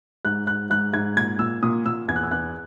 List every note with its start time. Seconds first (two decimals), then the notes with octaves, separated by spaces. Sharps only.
0.25 G#2 F#6
0.47 G#2 F#6
0.70 G#2 F#6
0.93 G#2 G#6
1.16 A#2 G#6
1.39 A#2 E6
1.63 A#2 D#6
1.86 A#2 E6
2.08 E2 G#6
2.16 F#6
2.23 E6
2.31 E2 F#6